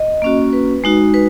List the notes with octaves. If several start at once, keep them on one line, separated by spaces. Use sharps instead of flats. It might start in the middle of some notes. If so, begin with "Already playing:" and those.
Already playing: D#5
A#3 C#4 F#4
B4
G#3 D#4 F#4
B4